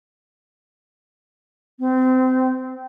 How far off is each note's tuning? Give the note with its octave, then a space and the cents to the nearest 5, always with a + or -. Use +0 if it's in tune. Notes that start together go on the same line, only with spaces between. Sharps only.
C4 -25